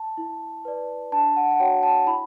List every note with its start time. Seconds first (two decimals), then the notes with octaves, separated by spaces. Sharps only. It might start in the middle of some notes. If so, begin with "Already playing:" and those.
Already playing: A5
0.17 E4
0.65 B4 D5
1.12 D4 A5
1.36 F#5
1.51 F#5
1.60 F#4 C#5 G5
1.83 A5
2.07 E4 B5